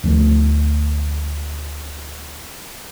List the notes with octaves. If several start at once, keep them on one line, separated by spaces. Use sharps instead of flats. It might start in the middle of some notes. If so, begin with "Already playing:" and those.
D2 F3 A3